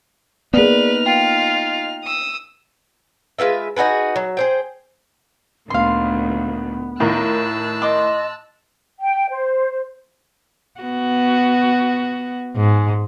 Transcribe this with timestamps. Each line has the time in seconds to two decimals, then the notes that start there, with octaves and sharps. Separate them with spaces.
0.54 A#3 B3 D#4 G#4 B4 D5 F6
1.06 F4 G5
2.04 D#6 E6
3.39 G#3 F4 B4 E5
3.76 D#4 F#4 G#4 B4
4.16 F#3
4.37 G#4 C5 G5
5.70 D2 A#2 D#3 B3 F5 C6
7.00 A2 D#3 F4 A#4 A5 E6 F#6
7.82 D#5 C6 D6
9.00 G5
9.30 C5
10.80 B3 F#4
12.56 G#2